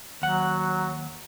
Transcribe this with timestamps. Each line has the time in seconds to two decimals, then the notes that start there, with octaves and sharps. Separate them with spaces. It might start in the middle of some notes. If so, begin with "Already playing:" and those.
0.22 D#2 F#3 F#5